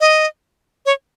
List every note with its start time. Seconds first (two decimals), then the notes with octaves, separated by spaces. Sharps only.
0.01 D#5
0.86 C#5